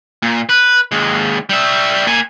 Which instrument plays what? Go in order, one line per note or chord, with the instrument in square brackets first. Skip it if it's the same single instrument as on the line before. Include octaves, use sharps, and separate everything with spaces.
[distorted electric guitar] A#2
B4
D#2 G#3
G3 E5
A#3 G#5